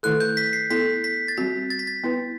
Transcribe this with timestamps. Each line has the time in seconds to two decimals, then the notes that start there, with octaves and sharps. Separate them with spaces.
0.03 D#3 A3 E4 A4 F#6
0.20 G6
0.37 B6
0.53 C7
0.70 B3 E4 A4 B6
1.04 B6
1.28 A6
1.37 G3 C4 F#4 B6
1.70 A6
1.79 B6
1.87 A6
2.04 B3 E4 B4